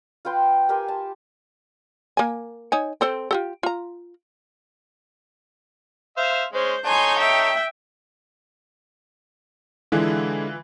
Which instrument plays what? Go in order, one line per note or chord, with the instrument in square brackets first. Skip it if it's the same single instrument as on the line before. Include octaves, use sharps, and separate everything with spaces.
[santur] F4 B4 G5 C6
G4 A#4 G#5 C6
A5
[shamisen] A#3 G#5
D#4 C#5 G#5
C4 A4 C5
F4 G4 A4
F4 A#5
[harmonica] C5 E5 F5
[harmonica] G#3 C#4 [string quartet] C5
[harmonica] D#4 A4 C#5 [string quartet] G#5 C6 G6
[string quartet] E5 G5
[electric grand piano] D3 G#3 E4 [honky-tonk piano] E3 F4